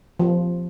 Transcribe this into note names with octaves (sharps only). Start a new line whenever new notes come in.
F3